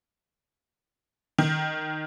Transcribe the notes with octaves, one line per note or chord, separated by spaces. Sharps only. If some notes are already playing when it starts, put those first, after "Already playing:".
D#3